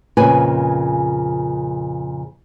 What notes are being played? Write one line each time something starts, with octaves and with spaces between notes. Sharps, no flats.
F2 A#2 C#3 G#4 B4 G#5